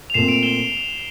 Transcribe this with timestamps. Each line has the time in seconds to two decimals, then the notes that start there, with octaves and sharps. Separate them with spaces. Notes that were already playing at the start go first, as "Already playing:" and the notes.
0.10 F7
0.14 A#2 A3 C4 C7 E7
0.28 D7 F7
0.43 E7 G7